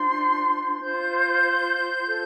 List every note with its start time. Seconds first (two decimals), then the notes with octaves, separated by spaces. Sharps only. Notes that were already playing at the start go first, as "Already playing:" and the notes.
Already playing: D4 F4 C5 C6
0.80 F4 C5 G6
2.06 F4 A4 C5